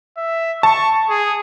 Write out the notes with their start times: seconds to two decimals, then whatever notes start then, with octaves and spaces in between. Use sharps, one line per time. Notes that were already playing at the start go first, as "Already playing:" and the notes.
0.17 E5
0.63 A5 C#6
1.09 G#4